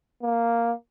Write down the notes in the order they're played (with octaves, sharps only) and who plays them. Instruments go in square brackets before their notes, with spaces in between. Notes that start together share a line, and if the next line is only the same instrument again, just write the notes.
[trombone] A#3